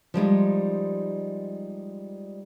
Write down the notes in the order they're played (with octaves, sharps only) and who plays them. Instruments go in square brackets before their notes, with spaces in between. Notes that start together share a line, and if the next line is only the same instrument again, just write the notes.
[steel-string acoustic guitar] F3 G3 G#3 D#4